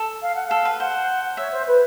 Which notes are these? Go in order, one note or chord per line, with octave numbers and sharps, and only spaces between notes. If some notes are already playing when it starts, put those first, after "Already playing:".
Already playing: A4
F5
F#5
A4 F5
B4
C5 F#5
C#5 E5
C5
B4